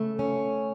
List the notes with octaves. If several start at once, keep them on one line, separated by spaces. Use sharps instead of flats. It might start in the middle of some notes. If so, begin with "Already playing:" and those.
Already playing: C#3 A3
C#4